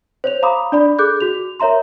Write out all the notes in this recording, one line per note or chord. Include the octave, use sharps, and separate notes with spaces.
C5 C#5 F7
F5 A#5 B5 D6 D#6
D4 D5 B5
G#4 A4 D6 F#6 G6
F#4 F7
A#4 C#5 E5 A#5 C6